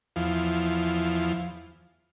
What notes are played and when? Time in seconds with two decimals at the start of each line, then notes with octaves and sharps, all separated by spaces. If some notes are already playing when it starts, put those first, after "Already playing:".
0.16 E2 F3